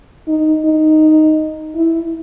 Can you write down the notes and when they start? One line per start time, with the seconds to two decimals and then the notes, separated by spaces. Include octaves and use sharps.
0.28 D#4
0.65 D#4
1.75 E4